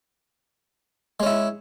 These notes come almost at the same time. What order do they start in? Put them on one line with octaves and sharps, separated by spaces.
G#3 C#4 E4